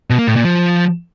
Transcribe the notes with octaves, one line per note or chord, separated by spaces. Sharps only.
B2
A#3
A2
A#2
F3